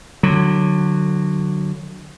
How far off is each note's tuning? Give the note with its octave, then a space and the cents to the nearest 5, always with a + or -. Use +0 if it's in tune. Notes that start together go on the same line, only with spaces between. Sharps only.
D3 +20 F#3 +0